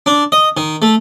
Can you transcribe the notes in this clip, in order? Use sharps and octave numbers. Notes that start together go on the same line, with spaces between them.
D4
D#5
D#3
A3